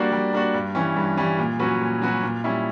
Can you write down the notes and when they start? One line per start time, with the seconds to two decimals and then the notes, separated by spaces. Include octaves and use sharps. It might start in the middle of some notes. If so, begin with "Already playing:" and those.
Already playing: G3 A#3 D4 F#4
0.12 G3
0.33 A#3 D4 F#4
0.54 G2
0.75 E3 G3 C#4
0.96 G2
1.17 E3 G3 C#4
1.39 A#2
1.59 F#3 C#4 F#4 B4
1.81 A#2
2.01 F#3 C#4 F#4 B4
2.23 A#2
2.44 G3 C#4 E4